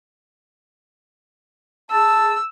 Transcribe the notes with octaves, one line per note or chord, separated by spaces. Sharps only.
G#4 A5 E6